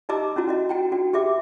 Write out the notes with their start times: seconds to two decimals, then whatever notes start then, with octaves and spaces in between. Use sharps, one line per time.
0.09 D#4 G4 D#5 A#5 D6 E6
0.36 C#4 E4 F#4 A#5
0.48 C#4 F#4 D#5
0.69 F#4 G5 A#5
0.92 D4 F#4
1.13 G4 G#4 E5 D6